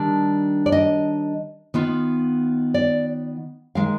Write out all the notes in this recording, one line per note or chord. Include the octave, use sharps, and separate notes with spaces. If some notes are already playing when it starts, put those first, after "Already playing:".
Already playing: D#3 G3 D4
D5
D#5
D#3 B3 F4
D5
D#3 G#3 F5